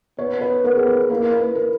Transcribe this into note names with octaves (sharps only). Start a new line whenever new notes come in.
B3 C#5
B4
B3 A#4
G#4
A#4
A#3 E4
B4
A#4